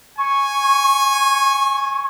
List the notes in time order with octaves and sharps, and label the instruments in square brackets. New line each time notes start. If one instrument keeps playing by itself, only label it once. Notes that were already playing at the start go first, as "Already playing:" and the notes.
[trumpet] G#5 [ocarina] C#6